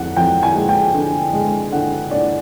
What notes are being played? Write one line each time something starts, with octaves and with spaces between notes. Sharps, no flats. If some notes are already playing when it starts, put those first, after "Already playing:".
Already playing: F2 F#5
F2 G5
G#5
G#3
G5
D3
G#3
D3 F#5
D3 D5